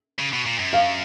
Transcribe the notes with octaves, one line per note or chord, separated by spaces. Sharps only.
C#3
B2
A#2
F#2
F5